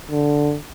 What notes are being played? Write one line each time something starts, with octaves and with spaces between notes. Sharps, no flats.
D3